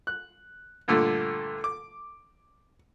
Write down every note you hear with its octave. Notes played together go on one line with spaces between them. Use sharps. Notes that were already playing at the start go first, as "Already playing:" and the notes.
F#6
G2 A#2 D3 A3
D6